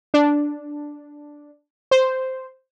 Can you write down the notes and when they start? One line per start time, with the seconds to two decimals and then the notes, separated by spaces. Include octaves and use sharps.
0.14 D4
1.91 C5